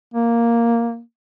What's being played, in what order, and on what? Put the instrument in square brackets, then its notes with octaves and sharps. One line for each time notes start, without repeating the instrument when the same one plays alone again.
[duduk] A#3